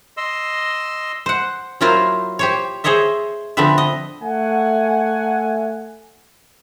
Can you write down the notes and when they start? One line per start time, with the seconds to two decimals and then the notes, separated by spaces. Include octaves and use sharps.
0.17 D#5 C6 E6
1.26 C5 F#5
1.81 F#3 A#3 E4 F4 A#4 C5
2.39 G4 C5 C#5
2.84 G#4 C5 C#5 D#5 E5
3.57 D3 F3 B3 C4 B4 E5
3.78 D#5
4.22 A3 F#5 G#5